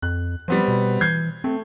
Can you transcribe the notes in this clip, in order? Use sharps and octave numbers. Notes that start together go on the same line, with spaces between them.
F2 F#6
F3 G3 B3 C4
B2
E3 G6 G#6 C7
A3 C4